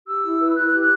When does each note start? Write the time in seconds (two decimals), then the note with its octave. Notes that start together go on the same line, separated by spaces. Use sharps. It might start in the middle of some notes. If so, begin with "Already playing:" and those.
0.07 G4 E6
0.23 E4
0.39 B4
0.56 E4 F#6
0.73 G4
0.81 F#6